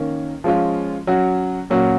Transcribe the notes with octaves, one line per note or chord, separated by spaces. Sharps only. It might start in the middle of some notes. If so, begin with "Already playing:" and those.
Already playing: D#3 A#3 C#4
F3 G#3 C#4 F4
F#3 C#4 F#4
A#2 F#3 C#4 F#4